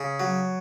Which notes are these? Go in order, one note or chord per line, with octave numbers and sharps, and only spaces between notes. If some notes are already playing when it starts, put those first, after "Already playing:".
Already playing: C#3
F#3